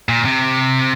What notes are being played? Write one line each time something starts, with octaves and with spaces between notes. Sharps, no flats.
A#2
C3